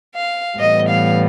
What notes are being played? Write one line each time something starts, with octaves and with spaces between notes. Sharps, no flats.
F5
A2 E3 G3 B3 D#5
F5